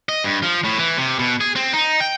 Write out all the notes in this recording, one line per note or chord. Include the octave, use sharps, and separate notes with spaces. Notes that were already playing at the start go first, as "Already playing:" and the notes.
D#5
G2
F3
A2
E3
C3
B2
G#4
C4
D#4
G5